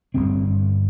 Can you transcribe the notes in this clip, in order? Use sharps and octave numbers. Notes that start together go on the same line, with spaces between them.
G1 G2 D3 C4